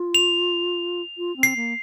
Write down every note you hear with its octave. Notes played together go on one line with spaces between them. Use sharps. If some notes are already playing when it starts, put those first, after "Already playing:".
Already playing: F4
F7
F4
C4
C7
A#3